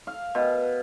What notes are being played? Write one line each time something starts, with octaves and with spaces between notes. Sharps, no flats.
F5
B2